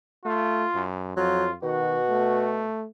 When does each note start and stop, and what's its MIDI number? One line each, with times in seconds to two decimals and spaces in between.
0.25 0.65 57
0.25 0.84 65
0.74 1.15 42
1.16 1.57 41
1.16 1.47 54
1.16 1.51 65
1.62 2.67 47
1.62 2.00 51
1.62 2.53 66
2.10 2.86 57